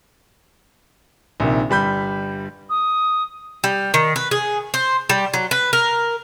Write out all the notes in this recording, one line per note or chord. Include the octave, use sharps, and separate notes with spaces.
A#1 C3 D#3
G1 G3 B5 G6
D#6
G3
D#3
B4
G#4
C5
G3
F#3
B4
A#4